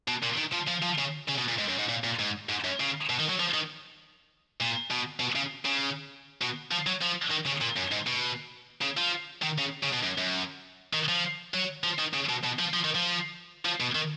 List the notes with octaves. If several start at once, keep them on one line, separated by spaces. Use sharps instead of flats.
B2
A#2
D#3
F3
F3
F3
C#3
C#3
B2
A#2
G#2
F#2
G#2
A#2
A#2
G#2
G#2
F#2
C#3
B2
D#3
F#3
F3
D#3
A#2
B2
B2
C#3
C#3
B2
F3
F#3
F3
D#3
C#3
A#2
F#2
G#2
B2
C#3
F3
D#3
C#3
C#3
B2
F#2
F#2
D#3
F3
F#3
F3
D#3
C#3
B2
B2
F3
F3
D#3
F3
F3
B2
D#3